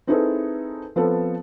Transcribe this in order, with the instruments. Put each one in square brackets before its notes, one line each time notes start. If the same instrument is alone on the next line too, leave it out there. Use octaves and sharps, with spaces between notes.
[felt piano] C4 D#4 E4 G#4 A4 B4
F3 B3 C4 A4